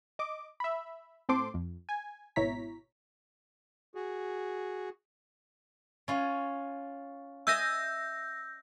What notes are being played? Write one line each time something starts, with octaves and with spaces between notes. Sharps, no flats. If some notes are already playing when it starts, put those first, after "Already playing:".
D#5 D6
E5 B5
A2 C4 A4 C5 C6 D6
F2
G#5
G#1 B2 E4 C#5 A#5 B6
F#4 G#4
C#4 F4
D#5 E5 G#5 E6 G6 A#6